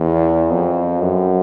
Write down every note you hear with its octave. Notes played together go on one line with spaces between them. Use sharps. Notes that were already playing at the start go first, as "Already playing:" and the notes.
Already playing: E2
F2
F#2